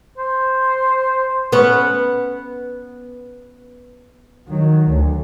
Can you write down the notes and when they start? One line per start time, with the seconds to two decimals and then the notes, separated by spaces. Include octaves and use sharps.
0.18 C5
1.52 B3 C#4
4.49 D#3 F#3
4.89 D2